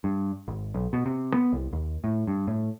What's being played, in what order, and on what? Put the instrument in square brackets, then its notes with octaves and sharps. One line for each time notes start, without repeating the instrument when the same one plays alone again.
[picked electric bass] G2
G#1
B1
B2
C3
B3
C2
D#2
A2
G2
A2